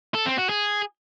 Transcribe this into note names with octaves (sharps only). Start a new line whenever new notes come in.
A4
C4
F#4
G#4